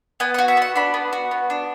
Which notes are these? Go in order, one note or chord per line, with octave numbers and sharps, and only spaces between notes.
B3 G#5
F#4 F#5
E5
B3 F#5
D4 B5
B3
F#4
B3
D4